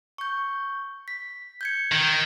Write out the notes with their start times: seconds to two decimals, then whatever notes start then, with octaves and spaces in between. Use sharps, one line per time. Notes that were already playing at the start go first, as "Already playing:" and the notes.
0.18 C#6 G6
1.08 B6
1.61 G6 G#6 C#7
1.92 D#3